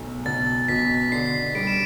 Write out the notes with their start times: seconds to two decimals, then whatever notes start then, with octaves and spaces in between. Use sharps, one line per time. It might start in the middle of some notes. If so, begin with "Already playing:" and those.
Already playing: B1 A3
0.26 B1 A6
0.69 B2 B6
1.12 D3 C7
1.55 G3 D7
1.67 E7